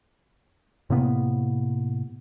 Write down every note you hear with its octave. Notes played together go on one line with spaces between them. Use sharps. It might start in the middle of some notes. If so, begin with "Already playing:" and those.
A2 C3 A#3 B3